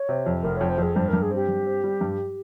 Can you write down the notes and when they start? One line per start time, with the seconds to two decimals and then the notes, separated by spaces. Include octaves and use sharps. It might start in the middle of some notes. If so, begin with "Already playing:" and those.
Already playing: C#5
0.09 C3
0.26 F2
0.43 F1 A#4
0.57 F2 C#5
0.69 C5
0.78 F2 G#4
0.96 G2 C5
1.09 G2 A#4
1.22 G#4
1.31 C4 G4
1.48 G2
1.67 C4
1.84 G3
2.01 G2